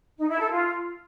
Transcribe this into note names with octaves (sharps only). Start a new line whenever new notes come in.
D#4
E4
A4
F4